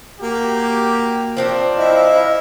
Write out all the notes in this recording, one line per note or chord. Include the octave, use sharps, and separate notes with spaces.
A#3 F#4 G4
F3 C4 D4
E4 D#5 F5